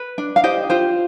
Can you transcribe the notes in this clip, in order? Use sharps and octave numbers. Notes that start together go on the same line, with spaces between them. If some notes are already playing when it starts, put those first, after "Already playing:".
Already playing: B4
D4
F5
G4 C5 D#5
F4 C5